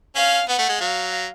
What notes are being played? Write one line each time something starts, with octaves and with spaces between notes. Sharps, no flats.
C#4 F5
B3 F#5
A3
G#3
F#3 F5